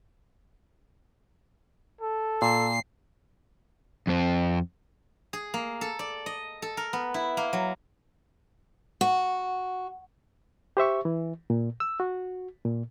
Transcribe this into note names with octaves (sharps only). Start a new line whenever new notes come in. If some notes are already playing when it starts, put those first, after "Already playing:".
A4
A#2 C7
F2 C4
G#4
A#3
A4
D5
D#5
A4
A#4
B3
E4
A#3
F#3
F#4
G4 C5 E5 C#6
E3
A#2
E6
F#4
A#2